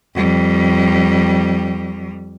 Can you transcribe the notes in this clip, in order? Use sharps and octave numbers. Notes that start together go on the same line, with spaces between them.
F2 G3